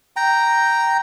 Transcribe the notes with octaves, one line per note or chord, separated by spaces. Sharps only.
G5 A#5